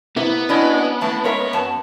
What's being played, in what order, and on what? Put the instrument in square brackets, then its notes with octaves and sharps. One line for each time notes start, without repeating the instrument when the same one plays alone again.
[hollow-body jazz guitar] C3 A#3 E4 [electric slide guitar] B3
[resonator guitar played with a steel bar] F#3 E4 D#5 [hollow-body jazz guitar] C#4 [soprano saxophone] D4
[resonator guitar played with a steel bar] A2 A3 [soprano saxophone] A5
[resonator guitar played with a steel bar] G#3 A#4 E5 [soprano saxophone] C#5
[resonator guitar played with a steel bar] F#2 A5